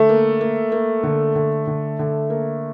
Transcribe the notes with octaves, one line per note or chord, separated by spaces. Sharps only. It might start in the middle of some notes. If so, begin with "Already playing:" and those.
Already playing: D3 A3
A#3
A#3
A#3
D3
D3
D3
D3
A#3